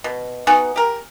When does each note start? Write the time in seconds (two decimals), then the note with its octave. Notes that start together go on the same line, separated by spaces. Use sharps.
0.04 B2
0.47 B3 D#4 F#4 G#5
0.76 G4 A#4